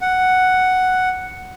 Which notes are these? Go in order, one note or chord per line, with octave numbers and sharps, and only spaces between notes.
F#5